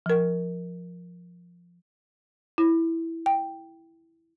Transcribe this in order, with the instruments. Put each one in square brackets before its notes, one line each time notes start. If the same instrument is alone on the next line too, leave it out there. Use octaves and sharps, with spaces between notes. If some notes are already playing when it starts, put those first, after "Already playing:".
[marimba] F3 A#4
E4
G5